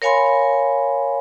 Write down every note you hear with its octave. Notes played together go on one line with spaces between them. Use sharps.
A#4 C#5 F5 G#5 B5 C6